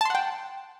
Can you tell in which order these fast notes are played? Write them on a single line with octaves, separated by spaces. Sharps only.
A5 C6 F#5 G5